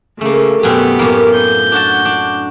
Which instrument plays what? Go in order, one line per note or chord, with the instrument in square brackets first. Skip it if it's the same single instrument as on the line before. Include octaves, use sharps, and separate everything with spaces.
[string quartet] C#3 [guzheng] A3 A#3
[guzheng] F#2 B2 C4 [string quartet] B3 G4
[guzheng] F#2 A2 A#3
[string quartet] G6
[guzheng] D4 F#4 A5
D4